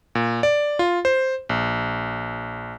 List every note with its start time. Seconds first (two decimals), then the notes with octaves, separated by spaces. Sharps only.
0.15 A#2
0.43 D5
0.79 F4
1.05 C5
1.49 A#1